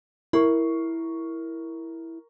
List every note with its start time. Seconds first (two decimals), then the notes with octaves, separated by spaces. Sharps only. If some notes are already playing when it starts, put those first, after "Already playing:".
0.33 E4 A#4 C#6 C7